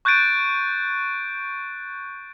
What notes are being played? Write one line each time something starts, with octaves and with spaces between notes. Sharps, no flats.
C#6 F#6 G6 A6 D7 D#7